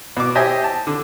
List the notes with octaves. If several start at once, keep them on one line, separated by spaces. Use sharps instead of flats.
B2 D6
G4 C5 D#5 E5 G#5
A5
D3